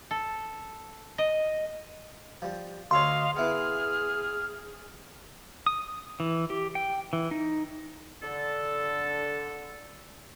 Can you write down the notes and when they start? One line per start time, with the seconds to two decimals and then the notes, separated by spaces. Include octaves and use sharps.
0.11 A4
1.18 D#5
2.42 F3 G3
2.91 D2 A4 C#5 D#5 F5 C6
3.36 B3 E4 G#4 B4 F6
5.66 D#6
6.20 E3
6.50 G4
6.75 G5
7.13 E3
7.31 D#4
8.23 D3 A4